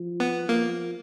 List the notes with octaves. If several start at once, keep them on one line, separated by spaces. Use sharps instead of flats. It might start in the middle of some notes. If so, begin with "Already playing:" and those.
Already playing: F3
B3
F3 A#3